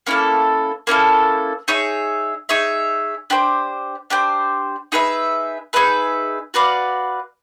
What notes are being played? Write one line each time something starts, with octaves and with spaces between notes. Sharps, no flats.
A#3 C#4 E4 A4
A#3 C#4 E4 A4
D#4 G#4 C#5 E5
D#4 G#4 C#5 E5
D4 G4 C5
D4 G4 C5
D#4 G#4 B4 E5
D#4 G#4 B4 E5
F#4 B4 D5 F5